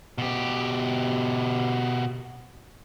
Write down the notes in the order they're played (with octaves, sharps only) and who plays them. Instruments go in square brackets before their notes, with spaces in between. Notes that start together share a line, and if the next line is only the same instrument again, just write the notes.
[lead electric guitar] B2 G4